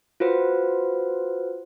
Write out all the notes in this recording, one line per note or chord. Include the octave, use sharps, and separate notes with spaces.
F4 F#4 B4 C5